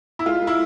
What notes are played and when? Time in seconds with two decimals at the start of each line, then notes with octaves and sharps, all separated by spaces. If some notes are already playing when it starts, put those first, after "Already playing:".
0.19 E4
0.26 G#3 F4
0.42 G#3
0.47 E4